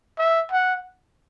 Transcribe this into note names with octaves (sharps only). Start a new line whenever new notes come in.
E5
F#5